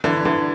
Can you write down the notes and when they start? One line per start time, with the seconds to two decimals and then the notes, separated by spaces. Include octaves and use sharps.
0.04 D3 E3
0.25 D3 E3